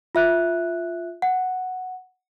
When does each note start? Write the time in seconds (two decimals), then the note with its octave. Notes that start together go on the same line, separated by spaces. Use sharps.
0.15 F4 E5 F#6
1.22 F#5